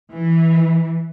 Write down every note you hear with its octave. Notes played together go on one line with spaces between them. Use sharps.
E3